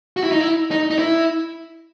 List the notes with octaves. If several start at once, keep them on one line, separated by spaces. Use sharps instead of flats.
F#4
E4
D#4
E4
D#4
D#4
E4